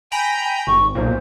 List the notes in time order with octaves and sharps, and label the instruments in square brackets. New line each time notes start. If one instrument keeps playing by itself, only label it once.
[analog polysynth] G5 A#5 B5 [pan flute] G#5
[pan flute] G#5
[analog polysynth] G#1 [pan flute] C#6
[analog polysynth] B1 A#2 [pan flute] C5